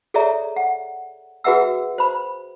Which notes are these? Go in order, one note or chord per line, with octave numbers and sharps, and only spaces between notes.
G#4 A4 C#5 D5 E5 A#5
F#5
F#4 G#4 B4 E5 F#5 E6
C5 B5